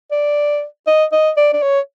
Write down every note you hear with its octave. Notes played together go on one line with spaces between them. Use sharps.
D5
D#5
D#5
D5
D5
C#5